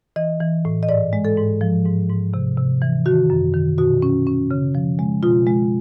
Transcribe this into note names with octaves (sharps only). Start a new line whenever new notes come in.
E3 D#5
E3
A2
D#5
G#2 D5
G#3
A4
G#2
F3
G#2
G#2
C3
C3
E3
D#3 F#4
F#2
D#3
B2 F#4
C#4
C#4
C#3
F3
G#3
B2 F4
G#3